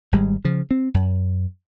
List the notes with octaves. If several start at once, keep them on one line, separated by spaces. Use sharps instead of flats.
G#1 G3 G#3
C#3 F3
C4
F#2